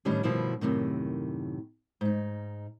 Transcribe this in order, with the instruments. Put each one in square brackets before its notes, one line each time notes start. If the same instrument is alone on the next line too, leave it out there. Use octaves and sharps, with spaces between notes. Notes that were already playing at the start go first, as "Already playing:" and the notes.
[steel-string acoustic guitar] A2 D#3 E3 G3 C#4 D4
G2 B2 D#3 F3 E4
F#2 A2 C3 D#3
G#2 D#4